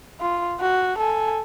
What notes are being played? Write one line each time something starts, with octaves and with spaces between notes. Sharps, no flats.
F4
F#4
A4 G#5